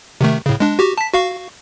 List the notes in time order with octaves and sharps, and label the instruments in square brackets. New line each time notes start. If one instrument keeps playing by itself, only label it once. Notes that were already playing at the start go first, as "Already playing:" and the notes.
[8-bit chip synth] C3 D#3 A3
A2 C#3
G#3 D4
F#4 G4
A5 B6
F#4 F5 C#6